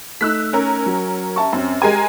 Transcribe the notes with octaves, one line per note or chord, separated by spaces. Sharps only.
A3 D#4 E6 F#6 B6
C#4 A#4
F#3
E5 A5 C#6
F#2 C4 C#4
G#3 G4 A#4 G#5